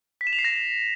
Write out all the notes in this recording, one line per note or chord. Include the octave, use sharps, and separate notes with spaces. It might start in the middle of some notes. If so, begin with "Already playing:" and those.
B6
E7
F7
C7
A#6